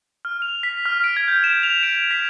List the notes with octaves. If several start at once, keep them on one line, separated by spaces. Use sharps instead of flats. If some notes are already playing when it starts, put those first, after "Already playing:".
F6
F7
B6
F6
D7
G#6
G6
E7
F7
D7
B6